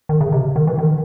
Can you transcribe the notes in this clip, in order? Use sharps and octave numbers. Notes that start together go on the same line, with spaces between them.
D#3
C#3
C3
D#3
E3
D#3